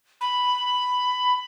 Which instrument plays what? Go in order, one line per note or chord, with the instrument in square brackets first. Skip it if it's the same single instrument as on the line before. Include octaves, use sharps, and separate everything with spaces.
[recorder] B5